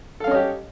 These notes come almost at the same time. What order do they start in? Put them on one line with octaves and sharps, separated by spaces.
A4 F5 C#4 D#5 G4